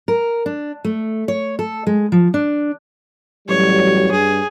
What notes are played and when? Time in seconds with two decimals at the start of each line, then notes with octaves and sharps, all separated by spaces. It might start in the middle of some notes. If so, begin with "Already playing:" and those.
0.08 A#4
0.46 D4
0.84 A3
1.28 C#5
1.59 A4
1.87 G#3
2.12 F3
2.34 D4
3.48 A1 F#3 G3 C#5
4.12 G2 G#4